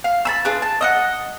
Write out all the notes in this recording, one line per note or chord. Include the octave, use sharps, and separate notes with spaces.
F5
A5 B5 E6
D4 F4 G#4 B4
A5
D#5 E5 F#5